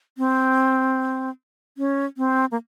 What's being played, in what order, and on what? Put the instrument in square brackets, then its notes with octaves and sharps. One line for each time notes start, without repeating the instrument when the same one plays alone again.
[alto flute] C4
C#4
C4
A#3